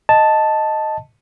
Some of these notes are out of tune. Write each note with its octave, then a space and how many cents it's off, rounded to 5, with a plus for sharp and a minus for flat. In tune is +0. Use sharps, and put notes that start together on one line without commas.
D#5 +0 A5 +0